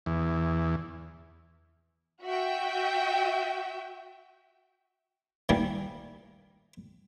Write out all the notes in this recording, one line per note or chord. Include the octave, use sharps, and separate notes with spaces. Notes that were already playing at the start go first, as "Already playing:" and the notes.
E2
F#4 E5 G5
D#3 E3 G3 A#3